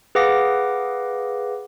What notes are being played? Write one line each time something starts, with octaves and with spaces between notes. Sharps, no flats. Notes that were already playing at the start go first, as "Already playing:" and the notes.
G#4 B4 F5 F#5 D6 A#6